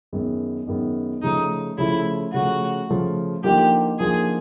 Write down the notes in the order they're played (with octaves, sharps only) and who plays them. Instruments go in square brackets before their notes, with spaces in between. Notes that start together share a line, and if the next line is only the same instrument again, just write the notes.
[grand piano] F#2 D#3 G#3 B3
F#2 D#3 G#3 B3
[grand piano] C#3 F3 A3 [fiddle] D#4
[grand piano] C#3 F3 A3 [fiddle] E4
[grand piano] C#3 F3 A3 [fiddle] F#4
[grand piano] C#3 F3 A3
[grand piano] D3 F3 A#3 D#4 [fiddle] G4
[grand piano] D3 F3 A#3 D#4 [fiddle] G#4